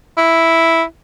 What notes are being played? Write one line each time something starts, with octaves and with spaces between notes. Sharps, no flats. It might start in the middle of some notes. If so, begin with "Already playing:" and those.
E4